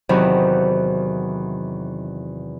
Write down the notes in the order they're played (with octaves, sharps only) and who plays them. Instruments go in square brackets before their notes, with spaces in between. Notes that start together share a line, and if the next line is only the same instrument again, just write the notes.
[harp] E2 C3 D#3 E3 F#3